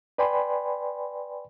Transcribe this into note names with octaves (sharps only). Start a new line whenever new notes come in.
B4 D5 G5 G#5 B5 C6